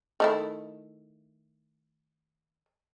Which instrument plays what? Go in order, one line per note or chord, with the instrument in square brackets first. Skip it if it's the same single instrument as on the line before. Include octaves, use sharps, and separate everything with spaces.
[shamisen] D#3 A3 E4